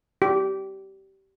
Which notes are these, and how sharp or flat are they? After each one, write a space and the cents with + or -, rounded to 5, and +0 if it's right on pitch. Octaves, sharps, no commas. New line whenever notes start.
G4 -20